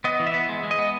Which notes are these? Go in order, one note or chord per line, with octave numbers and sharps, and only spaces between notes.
B3 D#5
E3
E5
B3
G#3
G#3
D#5
B3